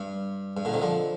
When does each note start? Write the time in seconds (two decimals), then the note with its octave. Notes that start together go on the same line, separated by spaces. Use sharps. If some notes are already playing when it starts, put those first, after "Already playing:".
Already playing: G2
0.57 G2
0.65 A#2 D3
0.73 C3 D#3
0.82 D3 F3